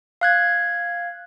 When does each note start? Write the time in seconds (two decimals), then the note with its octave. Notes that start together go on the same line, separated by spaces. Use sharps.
0.21 F5 F#6 G#6